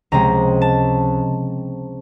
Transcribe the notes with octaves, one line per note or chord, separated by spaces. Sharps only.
C#2 C3 F3 G#3 C4 A#5
A5